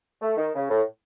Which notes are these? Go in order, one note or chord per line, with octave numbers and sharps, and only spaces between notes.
A3
D#3
C#3
A2